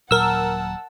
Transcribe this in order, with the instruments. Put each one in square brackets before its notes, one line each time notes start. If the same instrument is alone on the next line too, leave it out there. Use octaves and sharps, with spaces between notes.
[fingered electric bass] D#1 A#2 F#3 [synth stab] A#4 E6 [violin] F#5 A5